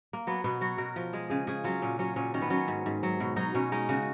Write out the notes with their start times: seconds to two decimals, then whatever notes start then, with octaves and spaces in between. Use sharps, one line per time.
0.13 A#3
0.27 F#3 B3
0.44 B2 B3
0.61 F#3 F#4
0.78 B2 A#4
0.96 F3
1.13 G#3 G#4
1.30 C#3 G#4
1.47 C#3 G#4
1.64 F#3 F4
1.82 A#2 C#4
1.99 F#3 C#4
2.16 A#2 C#4
2.34 D#3 C#4
2.42 B3
2.50 F#3 C#4
2.68 G#2
2.86 G#2
3.03 F#3
3.20 B2
3.36 F#3 D#4
3.54 B2 C#4
3.72 G#3 D#4
3.89 C#3 F#4